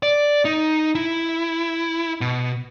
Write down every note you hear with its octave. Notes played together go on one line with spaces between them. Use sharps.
D5
D#4
E4
B2